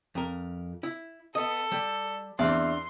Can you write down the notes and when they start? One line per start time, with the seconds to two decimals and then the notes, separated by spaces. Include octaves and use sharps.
0.15 F2 A#4
0.83 E4
1.35 B3 A4 D#5
1.72 G3
2.39 E2 C4 D4 D5 C6